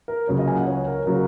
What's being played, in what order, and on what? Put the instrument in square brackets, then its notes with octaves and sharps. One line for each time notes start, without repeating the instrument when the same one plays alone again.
[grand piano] A#4
C#2 C#3 F#3 A#3 C#5
D#5
G#5
F#5
C#5
A#4
C#3 F#3 A#3 A#4